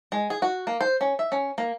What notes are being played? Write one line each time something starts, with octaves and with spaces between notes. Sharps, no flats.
G#3
G#4
F#4
A#3
C5
C#4
E5
C#4
A#3